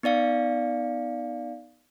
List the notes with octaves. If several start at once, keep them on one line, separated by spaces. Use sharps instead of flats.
B3 D#4 D5 F5 C#7